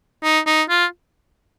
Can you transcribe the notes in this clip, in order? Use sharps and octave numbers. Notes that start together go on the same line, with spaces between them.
D#4
D#4
F4